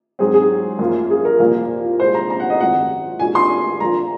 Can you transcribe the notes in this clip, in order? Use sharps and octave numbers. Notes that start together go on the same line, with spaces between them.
G#2 F#3 C4 G#4
G#4
F#2 F3 A#3 F4
G#4
A#4
C2 A#2 F3 A#3
C2 A#2 G#3 C5
A#5
A#5
F#5
D#5
G#1 F#2 F3 C4 F#4 F#5
A#2 G#3 D#4 F#4 G#5
C6
A#1 A#2 F3 A#3 F4 A#5